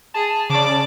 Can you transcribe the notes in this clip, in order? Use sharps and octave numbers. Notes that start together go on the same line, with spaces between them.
G#4 A5
C#3 D5 D6